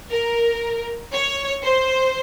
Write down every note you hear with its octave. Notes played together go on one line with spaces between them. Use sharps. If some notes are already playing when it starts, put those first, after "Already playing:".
A#4
C#5
C5